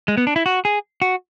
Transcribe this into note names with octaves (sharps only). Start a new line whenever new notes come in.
G#3
B3
D4
E4
F#4
G#4
F#4